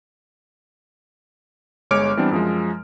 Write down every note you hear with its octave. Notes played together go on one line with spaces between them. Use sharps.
G1 G#3 C#5 D6 F6 D7
E3 G3 B3 C4 D4
F#2 F3 G#3